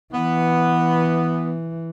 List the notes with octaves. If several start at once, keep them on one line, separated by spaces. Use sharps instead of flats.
E3 B3